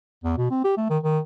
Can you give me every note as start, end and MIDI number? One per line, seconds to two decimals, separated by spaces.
0.24 0.36 40
0.37 0.51 47
0.51 0.64 60
0.64 0.73 67
0.77 0.85 57
0.90 0.98 51
1.03 1.19 51